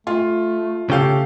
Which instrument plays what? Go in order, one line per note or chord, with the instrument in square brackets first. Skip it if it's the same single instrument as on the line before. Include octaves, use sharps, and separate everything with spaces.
[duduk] A3 [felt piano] F4
[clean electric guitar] C#3 G4 [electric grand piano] A3 A4 F5